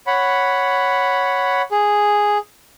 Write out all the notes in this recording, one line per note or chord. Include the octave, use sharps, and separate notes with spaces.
C#5 F#5 B5
G#4